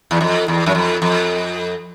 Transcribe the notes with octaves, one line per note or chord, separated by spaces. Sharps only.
E2
F2
E2
F#2
F2
F2